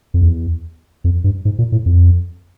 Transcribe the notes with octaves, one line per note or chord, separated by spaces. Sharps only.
F2
E2
F2
G2
G#2
A#2
A2
F2